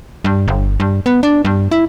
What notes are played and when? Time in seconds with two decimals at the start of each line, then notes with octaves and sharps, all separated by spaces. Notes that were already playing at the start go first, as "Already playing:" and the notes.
0.25 G2
0.48 G1
0.80 G2
1.06 B3
1.23 D4
1.45 G2
1.71 E4